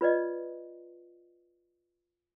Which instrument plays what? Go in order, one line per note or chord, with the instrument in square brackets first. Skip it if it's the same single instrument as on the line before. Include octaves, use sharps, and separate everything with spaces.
[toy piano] F4 B4 D5 D#5